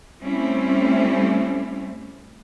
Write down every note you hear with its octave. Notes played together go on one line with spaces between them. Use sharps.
G3 A3 C4 C#4 E4